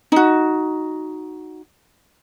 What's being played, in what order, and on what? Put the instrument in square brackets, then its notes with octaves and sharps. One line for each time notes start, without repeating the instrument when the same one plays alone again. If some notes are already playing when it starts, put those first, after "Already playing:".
[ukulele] D#4 F#4